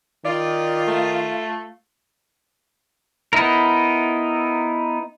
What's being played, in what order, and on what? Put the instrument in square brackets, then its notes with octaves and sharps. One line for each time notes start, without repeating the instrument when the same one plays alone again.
[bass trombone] D#3 [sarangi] F4 [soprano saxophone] D5
[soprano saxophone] A3
[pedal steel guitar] B3 D#4 E4 A#4